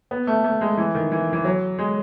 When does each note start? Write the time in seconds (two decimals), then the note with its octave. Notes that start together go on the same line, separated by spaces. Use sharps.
0.11 B3
0.27 A3
0.44 A3
0.61 G#3
0.77 E3
0.95 D#3
1.12 E3
1.33 E3
1.45 F#3
1.78 G#3